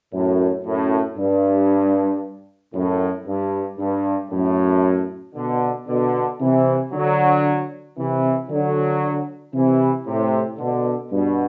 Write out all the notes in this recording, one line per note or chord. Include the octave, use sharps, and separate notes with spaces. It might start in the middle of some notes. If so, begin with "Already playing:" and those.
F#2 A2
F#2 A2
G2
F#2 A2
G2
G2
F#2 A2
B2 D3
B2 D3
C3 E3
D3 F#3
C3 E3
D3 F#3
C3 E3
A2 C3
B2 D3
G2 B2